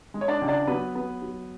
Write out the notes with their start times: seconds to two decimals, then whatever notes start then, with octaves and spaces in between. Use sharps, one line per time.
0.14 G#3
0.21 C#5
0.28 D4 D5
0.42 C#2
0.48 D4 D5
0.67 F#3 B3 B4
0.95 B3
1.22 F#3